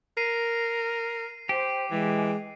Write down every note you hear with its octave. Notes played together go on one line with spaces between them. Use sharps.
A#4 C7 D#7
G4 C5
E3 G#3